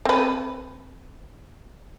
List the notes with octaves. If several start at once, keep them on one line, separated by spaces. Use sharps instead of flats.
C4 B4